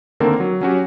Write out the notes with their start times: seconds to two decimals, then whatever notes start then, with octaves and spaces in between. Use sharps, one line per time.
0.20 D3 D#3 A#3 C4 A4 A#4
0.40 F#3
0.61 F#3 C#4 F#4 G4